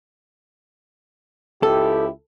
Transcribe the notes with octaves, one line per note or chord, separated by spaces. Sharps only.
C#2 E4 G4 A4